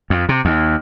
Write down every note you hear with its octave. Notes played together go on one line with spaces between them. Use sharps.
F2
C3
D#2